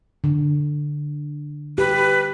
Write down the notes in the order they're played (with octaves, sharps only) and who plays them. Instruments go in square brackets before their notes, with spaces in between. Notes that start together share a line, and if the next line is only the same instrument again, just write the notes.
[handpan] D3
[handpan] G4 [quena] B4